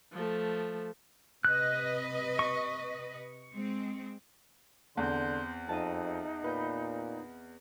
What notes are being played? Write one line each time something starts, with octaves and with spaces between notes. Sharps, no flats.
F3 A3
C3 B4 D#5 F#6
C#6
G#3 C4
E2 D3 C4 C6 F#6 G6
F2 D#4 D#5 E5 A5
A#2 B4 G6